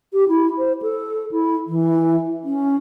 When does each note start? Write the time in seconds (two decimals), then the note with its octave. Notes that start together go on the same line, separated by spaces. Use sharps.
0.13 G4
0.28 E4
0.58 C5
0.82 A4
1.31 E4
1.67 E3
2.44 C#4